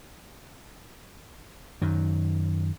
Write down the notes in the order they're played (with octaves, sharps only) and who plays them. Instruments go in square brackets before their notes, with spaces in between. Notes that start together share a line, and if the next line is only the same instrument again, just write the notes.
[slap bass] F#2 D#3